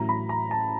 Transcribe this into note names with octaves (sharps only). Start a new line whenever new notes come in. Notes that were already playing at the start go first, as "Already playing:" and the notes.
Already playing: A1 A2 F#3 A#5
B5
A#5
A5